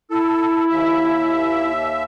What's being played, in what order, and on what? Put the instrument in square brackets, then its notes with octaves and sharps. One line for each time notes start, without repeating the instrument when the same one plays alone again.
[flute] E4 [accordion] A4
[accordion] D#2 E5